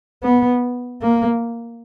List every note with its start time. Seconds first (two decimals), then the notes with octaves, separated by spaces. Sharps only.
0.23 B3
1.02 A#3